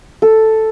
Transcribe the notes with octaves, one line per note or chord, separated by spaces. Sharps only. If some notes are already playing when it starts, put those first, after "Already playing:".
A4